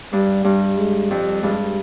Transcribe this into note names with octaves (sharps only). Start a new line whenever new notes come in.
G2 G3
G2
G#3
F2 G3
G2 G#3